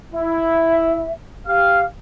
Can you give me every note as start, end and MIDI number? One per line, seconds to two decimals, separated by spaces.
0.13 1.05 64
0.13 1.11 76
1.47 1.84 67
1.47 1.84 77
1.47 1.81 89